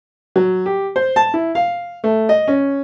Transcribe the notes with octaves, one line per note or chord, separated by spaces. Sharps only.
F#3
G4
C5
A5
E4
F5
A3
D#5
C#4